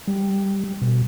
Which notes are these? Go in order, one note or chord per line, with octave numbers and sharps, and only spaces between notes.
G3
B2